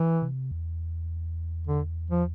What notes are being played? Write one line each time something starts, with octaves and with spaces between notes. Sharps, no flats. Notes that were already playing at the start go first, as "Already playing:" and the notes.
Already playing: E3
C3
E2
D3
F3